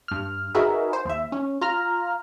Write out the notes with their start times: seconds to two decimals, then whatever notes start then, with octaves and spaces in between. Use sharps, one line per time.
0.08 G2 F6
0.54 D#4 F#4 G#4 A#4 B4 E5
0.93 C5
1.05 D#2 E5
1.32 C#4
1.61 F4 A#5 F6